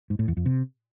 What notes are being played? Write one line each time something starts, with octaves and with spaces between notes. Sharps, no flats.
G#2
A2
E2
F2
C3